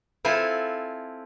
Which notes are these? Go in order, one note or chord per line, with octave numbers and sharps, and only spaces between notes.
C4 E4 F4 A4 G#5